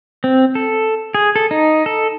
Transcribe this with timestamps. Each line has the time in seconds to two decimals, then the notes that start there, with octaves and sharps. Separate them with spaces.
0.24 C4
0.55 A4
1.14 G#4
1.36 A4
1.51 D#4
1.86 A4